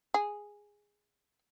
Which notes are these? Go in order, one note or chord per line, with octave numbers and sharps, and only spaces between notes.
G#4